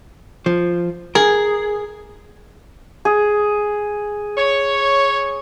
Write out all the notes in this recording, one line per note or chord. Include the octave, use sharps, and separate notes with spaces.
F3
G#4 A#4
G#4
C#5